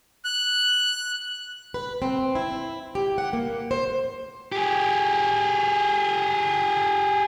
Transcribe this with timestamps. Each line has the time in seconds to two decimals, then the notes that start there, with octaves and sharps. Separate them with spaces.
0.25 F#6
1.74 B4
2.02 C4
2.35 E4
2.95 G4
3.18 F#5
3.33 A#3
3.71 C5
4.52 G4 G#4